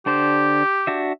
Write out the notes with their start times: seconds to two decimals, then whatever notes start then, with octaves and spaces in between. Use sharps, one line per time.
0.06 D3 D4 G4 C5
0.87 D4 F#4 E5